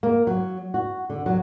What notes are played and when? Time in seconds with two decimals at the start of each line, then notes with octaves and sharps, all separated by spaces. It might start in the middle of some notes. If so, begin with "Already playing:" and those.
0.03 A#3
0.27 F#3
0.74 F#4
1.10 D3
1.26 F#3